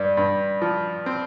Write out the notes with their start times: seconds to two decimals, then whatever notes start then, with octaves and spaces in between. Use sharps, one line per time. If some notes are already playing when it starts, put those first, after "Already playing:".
Already playing: G2 D5
0.17 G2
0.62 F3
1.06 C4